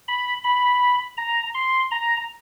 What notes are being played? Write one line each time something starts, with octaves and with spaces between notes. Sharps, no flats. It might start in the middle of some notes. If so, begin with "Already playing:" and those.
B5
B5
A#5
C6
A#5